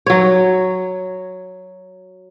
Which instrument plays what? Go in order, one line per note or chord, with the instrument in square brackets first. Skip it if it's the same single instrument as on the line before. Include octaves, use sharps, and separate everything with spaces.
[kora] F#3 C#5